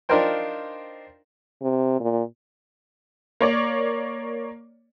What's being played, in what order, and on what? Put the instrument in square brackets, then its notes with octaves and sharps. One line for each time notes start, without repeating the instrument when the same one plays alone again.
[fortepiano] D4 D#4 F4 A#4 C5 G5
[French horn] C3
A#2
[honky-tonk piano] A#3 C#5 D5